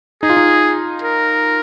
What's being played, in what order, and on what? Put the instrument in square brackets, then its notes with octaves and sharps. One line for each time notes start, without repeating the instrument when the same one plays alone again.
[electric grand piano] D#4 [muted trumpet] G#4
[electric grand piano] F4
D#4
[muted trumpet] A#4